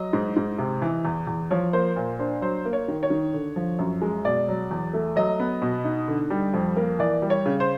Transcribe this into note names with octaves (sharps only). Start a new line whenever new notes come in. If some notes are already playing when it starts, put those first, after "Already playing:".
Already playing: F#3 D#5
G#2
G#2
C3
E3
E2
E2
F3 C#5
A#3 C5
A#2 C5
D4 C5
F#3 C5
A#3
C#5
D#3
C#5
D#3
D3
F3
F#2
G#3
B2 D5
F#3
E2
A3
F#3 D#5
B3
B2
D#4
D3
G3
F2
A#3
E3 D5
G3
C#5
C#3
C5